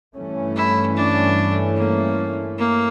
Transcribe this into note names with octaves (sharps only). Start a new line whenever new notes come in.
G2 E3 A3 C#4
E4
D4
A#3
A#3